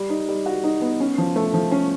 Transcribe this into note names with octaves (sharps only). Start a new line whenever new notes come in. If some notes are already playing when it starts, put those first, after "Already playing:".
Already playing: G3
D#4
G3
F#4
D#4
B3
C#4
F3
A3
F3
C#4